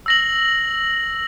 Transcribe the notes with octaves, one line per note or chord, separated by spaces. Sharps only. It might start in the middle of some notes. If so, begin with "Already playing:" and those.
E6 A#6 F#7